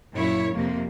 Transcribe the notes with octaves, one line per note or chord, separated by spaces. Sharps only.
F#2 A#2 E4 C#5
F2 C3 A#3